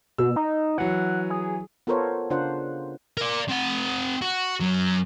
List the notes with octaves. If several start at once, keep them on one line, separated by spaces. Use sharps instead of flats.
B2 E6
D#4
E3 F#3 F#5
G#4
B3 F4 A4 A#4 C5 C#5
C#3 D4 F4 C5 F#5
A#4 D5
C4 F#5
F#4
F#2 F#3